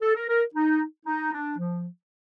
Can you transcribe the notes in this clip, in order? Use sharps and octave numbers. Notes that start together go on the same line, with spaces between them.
A4
A#4
A#4
D#4
D#4
D4
F3